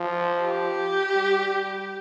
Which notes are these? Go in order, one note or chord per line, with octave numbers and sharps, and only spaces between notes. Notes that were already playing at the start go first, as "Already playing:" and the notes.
Already playing: F3
G4
G3